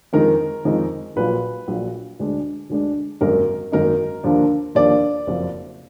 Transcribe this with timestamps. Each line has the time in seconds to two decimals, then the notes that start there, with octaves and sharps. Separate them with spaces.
0.13 F2 D#3 G#3 D#4 A#4
0.65 F2 D#3 G#3 D#4
1.16 A#1 A#2 F#3 B4
1.67 A#1 A#2 F#3
2.19 D2 D3 G#3 D4
2.69 D2 D3 G#3 D4
3.21 G#1 F#2 D#3 A#3 D#4 A#4
3.72 G#1 F#2 D#3 A#3 D#4 A#4
4.23 D#2 D3 F3 A#3 D4
4.75 D#2 D3 F3 A#3 D4 D5
5.27 F#1 F2 F3